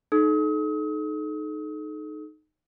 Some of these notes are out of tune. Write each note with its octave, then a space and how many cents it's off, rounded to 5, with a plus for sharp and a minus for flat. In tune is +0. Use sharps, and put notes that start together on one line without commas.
D#4 -15 A4 -35 D#6 +40